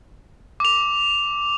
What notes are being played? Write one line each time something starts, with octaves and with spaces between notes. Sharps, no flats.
D6 F7